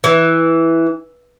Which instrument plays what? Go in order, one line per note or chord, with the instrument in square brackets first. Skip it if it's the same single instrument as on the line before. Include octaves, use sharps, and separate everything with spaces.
[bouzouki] E3